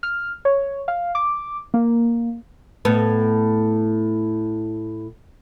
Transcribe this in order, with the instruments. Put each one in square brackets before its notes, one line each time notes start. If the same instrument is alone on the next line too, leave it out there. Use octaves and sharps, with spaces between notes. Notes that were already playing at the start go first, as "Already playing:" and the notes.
[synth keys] F6
C#5
F5
D6
A#3
[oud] A2 B3